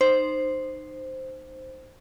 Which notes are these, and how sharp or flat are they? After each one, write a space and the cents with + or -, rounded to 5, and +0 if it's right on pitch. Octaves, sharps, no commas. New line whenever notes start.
D#4 -25 C5 +0